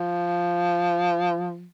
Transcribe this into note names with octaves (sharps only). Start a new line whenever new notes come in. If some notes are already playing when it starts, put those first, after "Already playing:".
Already playing: F3